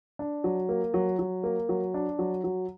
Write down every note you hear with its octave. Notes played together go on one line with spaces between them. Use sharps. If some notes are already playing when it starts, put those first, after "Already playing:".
D4
F#3
A#3
F#3
F#3
A#3
F#3
D4
F#3
F#3